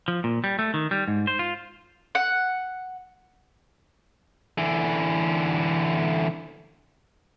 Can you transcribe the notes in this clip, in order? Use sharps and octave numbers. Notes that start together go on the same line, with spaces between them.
F3
A#2
G3
A3
D#3
G3
G#2
C5
F4
F#5
D3 E3